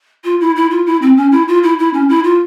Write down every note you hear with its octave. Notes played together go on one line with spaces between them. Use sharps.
F4
E4
E4
F4
E4
C4
C#4
E4
F4
E4
E4
C#4
E4
F4